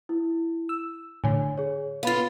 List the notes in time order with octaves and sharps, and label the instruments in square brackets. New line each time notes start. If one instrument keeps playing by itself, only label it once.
[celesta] E4
[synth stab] E6
[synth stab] A2 D3 [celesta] C#5 G#5
[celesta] G#4 C#5
[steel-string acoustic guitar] B3 F4 [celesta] F5 B5 A6